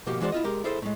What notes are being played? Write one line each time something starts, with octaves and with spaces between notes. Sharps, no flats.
B2 F3 A#3 F#4 G4
E3 G#3 F#4 C5 D5
E4 F4 D#5
G#3 G4 A#4
E4 G#4 A4 C5
A2 G#3